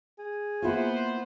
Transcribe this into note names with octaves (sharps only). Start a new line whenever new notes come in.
G#4
A#3 B3 E4 F4 C5